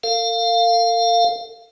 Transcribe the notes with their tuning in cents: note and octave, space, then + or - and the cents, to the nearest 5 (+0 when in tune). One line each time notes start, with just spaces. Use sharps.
A4 +45 F5 +0